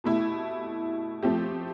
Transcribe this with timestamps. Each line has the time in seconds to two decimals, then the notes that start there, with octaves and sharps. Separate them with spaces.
0.04 B2 A3 E4 G4
1.23 F3 A3 C4 G4